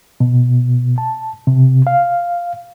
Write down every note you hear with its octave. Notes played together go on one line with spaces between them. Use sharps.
B2
A5
C3
F5